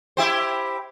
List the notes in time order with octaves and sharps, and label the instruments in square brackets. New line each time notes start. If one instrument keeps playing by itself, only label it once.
[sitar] E4 G4 C5